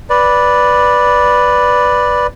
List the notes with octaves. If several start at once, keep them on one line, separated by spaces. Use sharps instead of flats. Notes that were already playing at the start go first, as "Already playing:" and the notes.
B4 D5